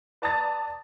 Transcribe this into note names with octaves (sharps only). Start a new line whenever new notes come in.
B4 D5 A5 A#5 D#6 A6